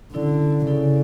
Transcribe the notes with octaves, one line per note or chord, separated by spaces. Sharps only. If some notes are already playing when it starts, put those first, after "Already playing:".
D3 C#4 E4 A4 D5
C#3 C#4 E4 A4 D5